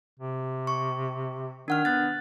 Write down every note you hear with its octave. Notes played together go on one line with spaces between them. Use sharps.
C3
C#6
D#3 D4 F#5 F6
B3 F#6 A6